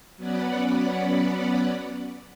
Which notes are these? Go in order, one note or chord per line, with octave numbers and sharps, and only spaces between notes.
F#3 B3 C#4 D5 F#5 B5